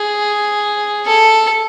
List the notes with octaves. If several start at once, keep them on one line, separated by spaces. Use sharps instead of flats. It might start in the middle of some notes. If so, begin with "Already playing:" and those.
Already playing: G#4
A4